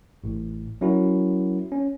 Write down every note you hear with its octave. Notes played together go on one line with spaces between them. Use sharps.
A1 A2
F#3 C#4 E4 F#4 A#4
C#4